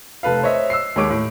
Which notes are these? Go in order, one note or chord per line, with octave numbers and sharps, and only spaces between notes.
F1 A4 B4 F5
C5 C#5 D#5 E5
E6 C7
D#2 G#3 C#5 D6 D7
A2